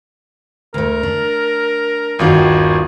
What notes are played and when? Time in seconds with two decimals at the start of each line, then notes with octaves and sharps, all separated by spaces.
0.74 D2 A3 A#4
1.03 D4
2.19 G1 D#2 D#3 F4 F#4